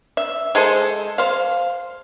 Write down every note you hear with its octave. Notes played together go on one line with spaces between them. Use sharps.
E5
G#3 G#4 A4 C5
C5 F5